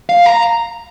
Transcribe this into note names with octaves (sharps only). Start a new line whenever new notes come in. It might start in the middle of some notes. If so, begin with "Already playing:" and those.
F5
A#5